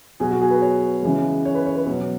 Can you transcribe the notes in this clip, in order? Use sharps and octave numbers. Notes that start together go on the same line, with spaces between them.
B2 F#3 G#4
F#4
G#4
B4
C#5
C#3 E3 G#3
C#5
B4
C#5
B4
B2 F#3